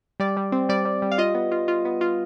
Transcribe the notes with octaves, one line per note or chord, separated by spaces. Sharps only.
G3 D5
G3
C4
G3 D5
G3
G3
F5
F4 D#5
B3
F4
F4
B3
F4